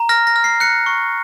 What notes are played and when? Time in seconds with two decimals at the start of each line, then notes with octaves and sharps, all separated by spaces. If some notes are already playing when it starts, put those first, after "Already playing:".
Already playing: A#5
0.09 F6 A#6
0.27 A#6
0.36 F6
0.44 C7
0.60 F#6 C#7
0.86 C#6